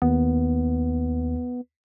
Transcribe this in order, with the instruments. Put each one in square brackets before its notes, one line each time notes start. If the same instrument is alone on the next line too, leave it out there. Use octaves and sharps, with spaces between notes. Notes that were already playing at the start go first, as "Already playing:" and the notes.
[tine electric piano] D#2 [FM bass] B3